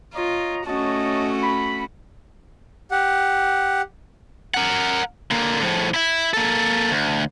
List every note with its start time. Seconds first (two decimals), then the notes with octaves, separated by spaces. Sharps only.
0.14 F4 C#5 D#5 A#5
0.66 A3 C#4 F#4 C#5 D#5 A5
1.41 B5
2.91 G4 F#5
4.54 A#4 F#5
5.31 D3 A#3
5.61 A2 F3
5.94 E4 E5
6.34 A#3 A4
6.91 D2